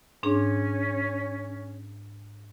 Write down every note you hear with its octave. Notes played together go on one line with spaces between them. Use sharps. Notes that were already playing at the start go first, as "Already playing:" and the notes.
G#2 C#4 D4 G#4